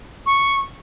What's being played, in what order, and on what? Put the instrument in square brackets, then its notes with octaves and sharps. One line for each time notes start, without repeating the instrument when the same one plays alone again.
[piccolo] C#6